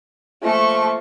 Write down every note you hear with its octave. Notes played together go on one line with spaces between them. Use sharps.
F3 A3 A#3 F4 C#6